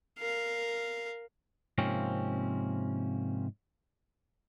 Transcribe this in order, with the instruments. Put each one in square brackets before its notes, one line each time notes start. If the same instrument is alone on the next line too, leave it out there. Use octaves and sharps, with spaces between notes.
[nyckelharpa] A#4 F5
[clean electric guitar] G#2 C3 F3 A#3 C4 C#4